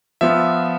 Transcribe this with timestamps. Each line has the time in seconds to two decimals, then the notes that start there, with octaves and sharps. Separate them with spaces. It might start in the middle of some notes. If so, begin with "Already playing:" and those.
0.21 F3 B3 F4 E5